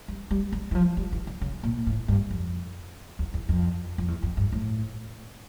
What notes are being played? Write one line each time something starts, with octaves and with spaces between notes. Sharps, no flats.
G3
G3
G3
E3
F3
G3
E3
D3
C#3
A#2
A2
G2
F2
E2
E2
F2
F2
E2
F2
G2
A2